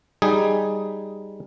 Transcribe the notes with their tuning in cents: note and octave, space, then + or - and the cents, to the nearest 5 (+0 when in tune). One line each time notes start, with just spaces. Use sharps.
G3 +5 D#4 +0 G#4 +0